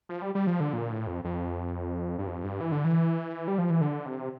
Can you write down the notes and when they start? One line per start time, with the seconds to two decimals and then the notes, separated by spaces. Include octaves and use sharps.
0.09 F3
0.22 G3
0.35 G3
0.47 F3
0.60 D3
0.73 A#2
0.90 A2
1.07 F2
1.24 F2
2.18 G2
2.27 F2
2.44 G2
2.60 E3
2.72 D3
2.84 E3
3.48 G3
3.58 F3
3.70 E3
3.81 D3
4.06 C3